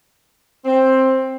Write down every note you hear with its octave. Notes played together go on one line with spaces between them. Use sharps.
C4